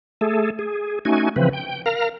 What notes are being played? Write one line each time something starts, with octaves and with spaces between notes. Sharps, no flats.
A3 G#4 A4
G#4
A3 C#4 D#4 F#4 G#5
C#3 E3 F3 C4 B4
G5
A#4 F5 A#5